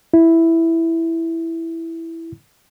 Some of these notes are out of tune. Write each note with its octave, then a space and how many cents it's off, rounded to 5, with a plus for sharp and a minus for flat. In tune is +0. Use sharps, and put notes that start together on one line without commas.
E4 +0